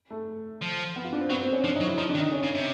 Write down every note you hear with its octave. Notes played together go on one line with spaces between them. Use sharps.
A3
F3
B3
F4
D4
C4
F#3 B3
C4
C#4
F3 D4
D#4
F#3
E4
F3 D#4
D4
D#3
D#4
C#4
C#3
C3